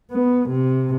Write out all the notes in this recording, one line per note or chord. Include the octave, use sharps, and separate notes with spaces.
B3
C3